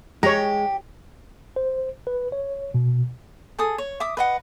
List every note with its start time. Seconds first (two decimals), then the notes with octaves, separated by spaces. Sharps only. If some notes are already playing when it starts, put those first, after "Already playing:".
0.23 G#3 G4 C#5 A#5
1.56 C5
2.07 B4
2.32 C#5
2.74 B2
3.59 G#4 A4 D#6
3.78 C#5
4.00 E5 D6 D#6
4.17 B4 D#5 F#5